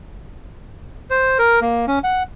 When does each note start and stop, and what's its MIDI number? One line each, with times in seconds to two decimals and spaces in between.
1.10 1.38 72
1.39 1.60 70
1.61 1.86 58
1.88 1.99 61
2.04 2.23 78